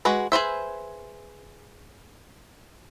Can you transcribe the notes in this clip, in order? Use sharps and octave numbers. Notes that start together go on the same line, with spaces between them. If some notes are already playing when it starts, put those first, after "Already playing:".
G#3 F#4 B4
G#4 B4 C5 E5